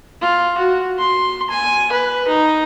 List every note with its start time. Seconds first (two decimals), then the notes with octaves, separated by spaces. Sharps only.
0.22 F4
0.58 F#4
0.98 C6
1.50 G#5
1.92 B4
2.28 D#4